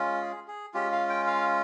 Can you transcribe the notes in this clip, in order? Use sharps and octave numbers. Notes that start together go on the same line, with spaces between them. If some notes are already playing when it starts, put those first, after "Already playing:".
Already playing: G#3 C#4 F4
G#4
G#4
G#3 C#4 F4 G4
F5
G5
F5